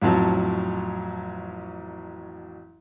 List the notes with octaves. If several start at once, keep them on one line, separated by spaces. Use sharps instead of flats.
A1 F2 F#3 A5